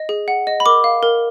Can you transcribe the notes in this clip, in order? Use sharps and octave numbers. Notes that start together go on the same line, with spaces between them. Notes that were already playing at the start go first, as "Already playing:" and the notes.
Already playing: D#5
G#4
F#5
D#5
B5
A#4 D6
F5
A#4